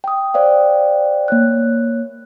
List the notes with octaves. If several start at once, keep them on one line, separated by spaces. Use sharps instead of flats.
G5 D#6
C5 D5 F5 G5
A#3 C#5 F#6